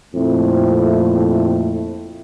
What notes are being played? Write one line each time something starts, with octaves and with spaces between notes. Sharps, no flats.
F2 A#2 A3 C4 E4